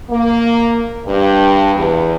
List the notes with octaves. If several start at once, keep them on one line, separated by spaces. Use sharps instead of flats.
A#3
G2
E2